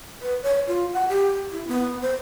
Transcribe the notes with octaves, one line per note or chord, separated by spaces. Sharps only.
B4
C#5
F4
F#5
G4
E4
B3
C5